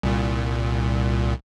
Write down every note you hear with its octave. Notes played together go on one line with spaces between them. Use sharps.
C2 A#2